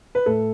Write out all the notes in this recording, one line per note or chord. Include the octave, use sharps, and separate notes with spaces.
B4
A2 A4